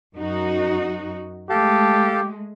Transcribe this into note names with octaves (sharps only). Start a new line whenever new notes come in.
F#2 D#4 F#4
G#3 A3 G4 A4 F5 A5